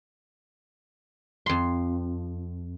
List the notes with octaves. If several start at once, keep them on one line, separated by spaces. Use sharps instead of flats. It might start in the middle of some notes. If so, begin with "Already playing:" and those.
F2 C6